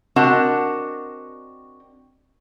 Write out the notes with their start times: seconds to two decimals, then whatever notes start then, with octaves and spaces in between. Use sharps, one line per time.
0.16 C4 D4 F#4 A#4 D#5 F#5